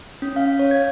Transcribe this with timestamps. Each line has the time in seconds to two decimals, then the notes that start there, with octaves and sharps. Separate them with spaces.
0.22 C#4
0.36 F5
0.59 C#5
0.71 G#6